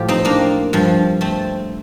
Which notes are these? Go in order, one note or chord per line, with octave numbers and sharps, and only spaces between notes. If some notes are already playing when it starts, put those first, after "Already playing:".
Already playing: A2 F3 F4 G4
C4 D#4
A#3 D4
G2 F3
A3 C4